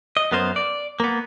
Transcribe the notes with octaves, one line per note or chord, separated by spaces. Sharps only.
D#5
F#2 B3 A#4 C5
D5
A#3 B3